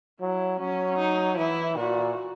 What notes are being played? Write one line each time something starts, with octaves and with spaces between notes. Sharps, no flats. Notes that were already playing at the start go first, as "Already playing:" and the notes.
F#3 E4
F#3 C#4
D#4
E3 E4
A#2 F#4